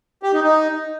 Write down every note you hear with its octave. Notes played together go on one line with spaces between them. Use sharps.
G4
D#4
D#4